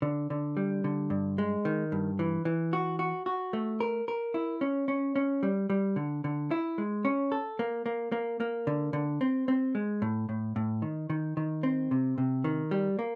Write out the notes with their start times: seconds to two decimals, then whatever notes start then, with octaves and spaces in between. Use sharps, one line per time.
0.02 D3
0.30 D3
0.57 G3
0.84 D3
1.10 G2
1.38 G#3
1.65 D#3
1.92 G2
2.19 E3
2.45 E3
2.73 F#4
2.99 F#4
3.26 F#4
3.53 A3
3.80 A#4
4.08 A#4
4.34 E4
4.61 C#4
4.88 C#4
5.16 C#4
5.43 G3
5.70 G3
5.96 D3
6.24 D3
6.51 E4
6.78 G#3
7.05 C#4
7.32 A4
7.59 A#3
7.86 A#3
8.12 A#3
8.40 A#3
8.67 D3
8.93 D3
9.21 C4
9.48 C4
9.75 G#3
10.02 A2
10.29 A2
10.56 A2
10.82 D#3
11.10 D#3
11.37 D#3
11.63 C4
11.91 C3
12.18 C3
12.44 D#3
12.71 G3
12.99 A#3